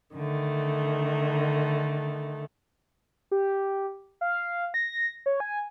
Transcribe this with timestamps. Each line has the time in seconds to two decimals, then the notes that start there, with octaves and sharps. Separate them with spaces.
0.14 D3 D#3 A3
3.31 G4
4.21 F5
4.74 A#6
5.26 C#5
5.40 G#5